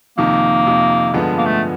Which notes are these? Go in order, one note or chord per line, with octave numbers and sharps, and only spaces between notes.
F2 C3 D#3 A#3
F2 C3 D#3
G2 D3 F3 G#3 B3
A#3
A3